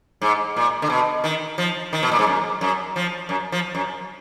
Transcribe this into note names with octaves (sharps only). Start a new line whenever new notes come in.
G#2
A#2
D3
B2
D#3
F3
D#3
B2
A#2
G#2
F#2
F#2
F3
F#2
F3
F#2